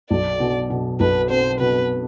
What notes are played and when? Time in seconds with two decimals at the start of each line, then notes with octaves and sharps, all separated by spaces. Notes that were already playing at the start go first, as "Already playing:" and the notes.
0.10 B1 D5
0.40 B2
0.70 B2
1.00 B1 B4
1.30 C4 C5
1.60 B2 B4